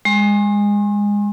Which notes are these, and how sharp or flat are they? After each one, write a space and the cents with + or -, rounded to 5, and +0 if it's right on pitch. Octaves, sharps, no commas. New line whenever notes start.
G#3 -20 C6 +40